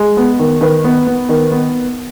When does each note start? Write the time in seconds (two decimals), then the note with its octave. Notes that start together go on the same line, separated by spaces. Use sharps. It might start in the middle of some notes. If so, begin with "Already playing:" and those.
Already playing: G#3
0.17 B3
0.39 D#3
0.61 D#3 B4
0.84 B3
1.07 B3
1.29 D#3
1.52 B3